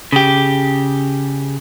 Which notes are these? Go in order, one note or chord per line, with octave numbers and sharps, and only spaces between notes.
C#3 G4